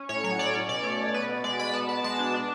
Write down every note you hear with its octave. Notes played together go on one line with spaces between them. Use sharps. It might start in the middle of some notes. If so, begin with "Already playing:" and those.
Already playing: C#4
A2 C#5
F#3 C#5
A2 D5
C#4 C#5
B2 D5
A3 C#5
B2
B3 B4
B2
G#3 D5
B2 B5
B3 A5
B2 A5
G#3 A5
D4
D4